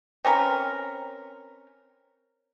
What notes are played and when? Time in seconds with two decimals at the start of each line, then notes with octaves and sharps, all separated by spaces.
0.24 C4 C#4 A#4 B4